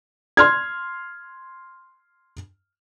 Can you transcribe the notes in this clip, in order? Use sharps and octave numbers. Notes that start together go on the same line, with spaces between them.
C6 F6 G#6